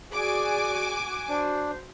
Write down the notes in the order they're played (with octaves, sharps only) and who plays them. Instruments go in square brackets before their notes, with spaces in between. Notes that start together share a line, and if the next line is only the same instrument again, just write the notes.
[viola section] F#4 [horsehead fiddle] G#4 D5 [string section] G#5 D6
[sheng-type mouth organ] D4 [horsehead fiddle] C5